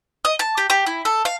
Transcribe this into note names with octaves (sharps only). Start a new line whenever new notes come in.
D#5
A5
G4
G4
E4
A4
F5